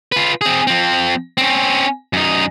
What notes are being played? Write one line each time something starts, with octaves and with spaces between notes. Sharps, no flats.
F4 B4
C4 G#4
F3 C4
C4 C#4
F#2 D#4